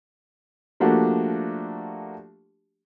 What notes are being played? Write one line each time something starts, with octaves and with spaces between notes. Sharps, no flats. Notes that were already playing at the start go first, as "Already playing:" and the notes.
F3 A3 A#3 D4 F#4 G4